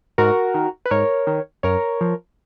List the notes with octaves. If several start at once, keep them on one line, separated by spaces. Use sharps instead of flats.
G#2 F#4 A#4
D#3
B4
G#2 A#4 C#5
D#3
F#2 A#4 C#5
F3